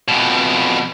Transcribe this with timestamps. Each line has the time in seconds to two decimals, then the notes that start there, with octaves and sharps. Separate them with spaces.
0.08 F2 B2